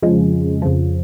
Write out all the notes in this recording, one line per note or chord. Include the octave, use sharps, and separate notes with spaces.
F2 C#3 F3 G#3
F2 C#3 F3